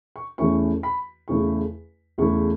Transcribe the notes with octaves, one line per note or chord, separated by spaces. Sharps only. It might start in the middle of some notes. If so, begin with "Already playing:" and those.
C#6
E2 E3 A3 C#4 E4 C#6
B5
E2 C#3 A3 E4 C#6
E2 C#3 A3 E4 C#6